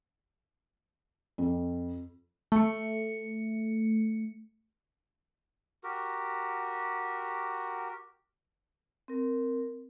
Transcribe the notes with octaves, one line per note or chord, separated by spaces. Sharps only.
F2
A3 C#7
F#4 G4 A#4
C4 A#4